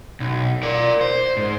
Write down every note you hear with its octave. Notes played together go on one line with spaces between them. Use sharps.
B1
A#4 D5
C5
G#2